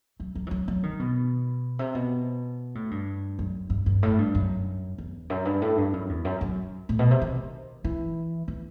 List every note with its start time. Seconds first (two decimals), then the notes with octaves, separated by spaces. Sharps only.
0.20 F#3
0.35 F#3
0.47 E3
0.51 F#3
0.68 F#3
0.83 D#3
1.00 B2
1.79 C3
1.95 B2
2.75 A2
2.91 G2
3.39 F#2
3.70 G2
3.86 G2
4.03 A2
4.19 G2
4.35 F#2
4.98 E2
5.30 F#2
5.45 G2
5.62 A2
5.78 G2
5.93 F#2
6.09 E2
6.25 F#2
6.41 F#2
6.89 A2
6.99 B2
7.11 C3
7.21 D#3
7.84 E3
8.48 E3